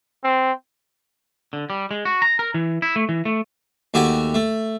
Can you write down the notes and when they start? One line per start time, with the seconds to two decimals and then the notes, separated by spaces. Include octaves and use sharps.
0.24 C4
1.53 D3
1.70 G3
1.91 G#3
2.05 F#4
2.22 A#5
2.39 A#4
2.54 E3
2.82 E4
2.96 A3
3.09 E3
3.25 A3
3.94 D#2 A3 F#4 G4 G#5 C#6
4.34 A3